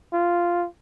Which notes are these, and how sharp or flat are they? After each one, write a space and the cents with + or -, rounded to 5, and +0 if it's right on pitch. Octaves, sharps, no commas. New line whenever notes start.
F4 -5